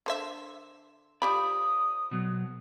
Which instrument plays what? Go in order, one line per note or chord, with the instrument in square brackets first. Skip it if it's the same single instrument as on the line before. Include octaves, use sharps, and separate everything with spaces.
[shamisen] D3 C5 E5
[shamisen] F3 G4 B5 [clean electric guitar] D5 [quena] D#6
[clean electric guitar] B2 F#3